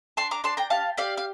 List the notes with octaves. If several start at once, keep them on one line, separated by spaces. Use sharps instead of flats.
D4 A5 C6
A#5 D6
D4 A5 C6
G5 A#5
G4 F5 A5
G4 D5 F5
F5